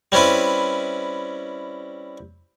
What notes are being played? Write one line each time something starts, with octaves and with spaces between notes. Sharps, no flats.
G3 C4 C#4 E4 B4